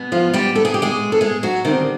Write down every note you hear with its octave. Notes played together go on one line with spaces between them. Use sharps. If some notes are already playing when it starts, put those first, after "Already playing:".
Already playing: B2 G#3 B3
F3 F4
G3 G4
A4
G#4
G4
G#3 G#4
A4
G#3 G#4
F#3 F#4
D3 D#3 G3 C4 D#4